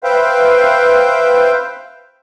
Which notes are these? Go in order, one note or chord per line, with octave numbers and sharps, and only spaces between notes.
B4 C5 E5 F5 G5